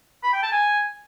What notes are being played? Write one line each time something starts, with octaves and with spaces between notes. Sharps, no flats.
B5
G5
A5
G#5